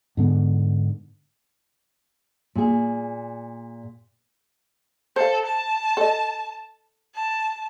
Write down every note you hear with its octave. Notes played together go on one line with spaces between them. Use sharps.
G#2 D3 B3
A#2 G#4
A4 C5 F5
A5
A4 D#5
A5